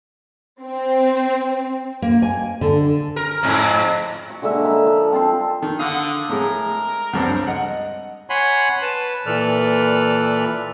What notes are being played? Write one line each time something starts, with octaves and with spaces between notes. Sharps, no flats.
C4
A#3
G#5
D3
A#4
F2 G#2
C#6
D3 G#3 A#3 E5
A#4 D#5 B5
F3
C4 A4 A5 C6
D#3
D3 F5 F#5 D#6
A2 G#3 A#4
C#2 G2 C4
D#5 F#5
C#5 F#5 G#5 B5 C6
B4 A5
A#2 E3 A4 B4 D5 F6